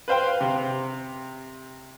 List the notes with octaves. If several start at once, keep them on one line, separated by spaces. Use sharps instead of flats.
B4 C5 F5 G5
C3